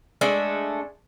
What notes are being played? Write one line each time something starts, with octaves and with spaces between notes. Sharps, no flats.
G#3 A3 D4 E5